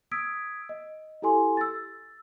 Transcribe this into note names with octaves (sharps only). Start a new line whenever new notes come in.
D#6 E6 G#6 B6 D7
D#5
E4 G4 A4 G#5 C6
E6 A6